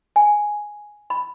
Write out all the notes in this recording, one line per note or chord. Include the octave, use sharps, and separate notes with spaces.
G#5
B5